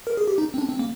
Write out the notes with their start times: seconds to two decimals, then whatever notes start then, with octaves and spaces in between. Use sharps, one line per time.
0.07 A#4
0.17 G#4
0.28 G4
0.38 D#4
0.54 C4
0.58 D4
0.69 C4
0.79 A#3